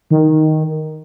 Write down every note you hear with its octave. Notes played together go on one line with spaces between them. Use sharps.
D#3